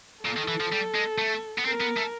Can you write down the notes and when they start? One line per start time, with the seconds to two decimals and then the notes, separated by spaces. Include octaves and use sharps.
0.24 A#2 A4
0.37 D#3
0.48 E3
0.60 F3
0.72 G3
0.95 G#3
1.18 A3
1.58 B3
1.65 C4 A#4
1.81 B3
1.97 A3